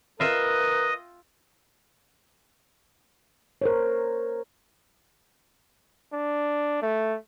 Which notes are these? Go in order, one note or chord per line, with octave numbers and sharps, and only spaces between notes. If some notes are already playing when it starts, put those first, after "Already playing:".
F4 A#4 B4 D#5 E5 G5
A#4 C5 C#5
D4
A3